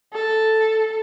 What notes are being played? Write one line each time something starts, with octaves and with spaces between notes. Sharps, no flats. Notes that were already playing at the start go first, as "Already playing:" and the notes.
A4